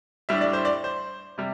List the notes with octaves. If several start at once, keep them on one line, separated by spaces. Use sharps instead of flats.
A2 G3 D4 E5
D5
C5
D5
C5
C3 G3